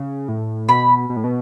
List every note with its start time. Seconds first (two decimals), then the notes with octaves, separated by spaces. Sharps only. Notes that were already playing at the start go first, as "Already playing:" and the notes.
Already playing: C#3
0.28 A2
0.69 B2 B5
1.09 B2
1.16 A2
1.24 B2